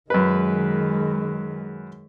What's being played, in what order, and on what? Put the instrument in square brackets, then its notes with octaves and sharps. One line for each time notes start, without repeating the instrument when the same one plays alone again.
[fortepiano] F#2 B4 [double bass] D#3 G#3